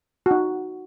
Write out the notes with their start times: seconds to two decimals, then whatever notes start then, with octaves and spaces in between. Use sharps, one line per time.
0.26 F#4
0.31 D#4